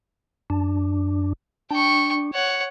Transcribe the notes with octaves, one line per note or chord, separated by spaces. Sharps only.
F#2 D4
D4 G5 C#6
C#5 F#5